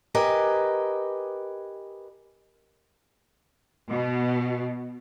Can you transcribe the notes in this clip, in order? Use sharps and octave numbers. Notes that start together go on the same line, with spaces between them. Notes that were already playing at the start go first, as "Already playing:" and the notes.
G4 A#4 B4 D#5 G#5
B2